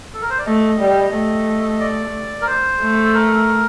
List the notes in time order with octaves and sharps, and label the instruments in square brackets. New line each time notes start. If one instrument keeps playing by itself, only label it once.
[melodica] A4
A#4
C5
D5
[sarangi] A3 [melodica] D#5
[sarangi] G3
A3
[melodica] D5
A#4
C5
[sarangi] A3
[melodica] A4
A#4